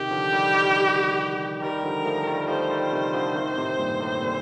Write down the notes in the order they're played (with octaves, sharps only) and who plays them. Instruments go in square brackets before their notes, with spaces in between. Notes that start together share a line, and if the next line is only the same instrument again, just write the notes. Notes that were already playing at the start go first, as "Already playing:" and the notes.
Already playing: [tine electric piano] C3 D#3 [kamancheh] G4
[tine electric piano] D3 F3
D#3 G3
D#3 G3
[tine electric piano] D#3 G3 [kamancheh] A#4
[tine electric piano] D3 F3
F3 A3
D#3 G3
[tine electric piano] F3 A3 [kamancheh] C5
[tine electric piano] D#3 G3
C3 D#3
D3 F3
C3 D#3
A2 C3
G2 A#2
A2 C3
A#2